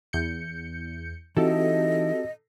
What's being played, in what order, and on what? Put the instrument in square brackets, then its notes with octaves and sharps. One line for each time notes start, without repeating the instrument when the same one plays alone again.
[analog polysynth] E2 G6 C#7
[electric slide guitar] E3 D#4 E4 [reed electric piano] C4 F#4 G4 [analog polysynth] A4 [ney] D#5